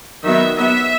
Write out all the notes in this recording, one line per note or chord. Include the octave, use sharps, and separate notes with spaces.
D#3 F#3 B3 E5
F#3 B3 E5